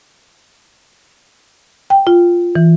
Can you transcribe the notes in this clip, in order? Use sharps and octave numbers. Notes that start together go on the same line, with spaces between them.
G5
F4
E3